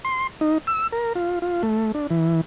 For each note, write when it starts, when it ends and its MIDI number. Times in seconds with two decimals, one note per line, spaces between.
0.05 0.27 84
0.41 0.58 63
0.67 0.87 88
0.92 1.13 70
1.15 1.39 65
1.42 1.62 65
1.63 1.92 57
1.94 2.07 62
2.10 2.41 52